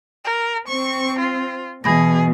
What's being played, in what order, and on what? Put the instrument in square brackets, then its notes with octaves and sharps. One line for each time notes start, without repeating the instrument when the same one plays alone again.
[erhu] A#4
[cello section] C4 [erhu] C#6
[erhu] F4
[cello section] B2 [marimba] E3 B5 A#6 [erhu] G#4